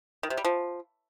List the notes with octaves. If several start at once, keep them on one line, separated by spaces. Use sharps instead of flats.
D#3
C3
G3
F3